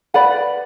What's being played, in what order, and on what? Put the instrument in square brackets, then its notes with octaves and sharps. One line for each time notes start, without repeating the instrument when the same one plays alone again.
[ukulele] B4 D5 F#5 B5